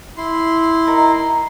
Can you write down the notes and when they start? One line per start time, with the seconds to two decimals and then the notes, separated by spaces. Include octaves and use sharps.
0.17 E4 C6
0.87 D#4 A#4 A#5